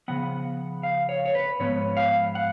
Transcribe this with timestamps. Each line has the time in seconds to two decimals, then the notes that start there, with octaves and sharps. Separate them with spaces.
0.08 C#3 F3 B3 F#5
0.83 F5
1.09 C#5
1.26 C#5
1.35 B4
1.60 G#2 F3 B3 C#5
1.97 F5
2.35 F#5